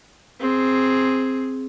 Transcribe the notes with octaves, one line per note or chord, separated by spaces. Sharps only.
C4 G#4